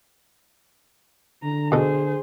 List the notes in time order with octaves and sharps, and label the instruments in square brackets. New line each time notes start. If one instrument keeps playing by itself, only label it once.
[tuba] D3 [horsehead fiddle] A#5
[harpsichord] B2 A4 [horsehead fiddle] G#4 C5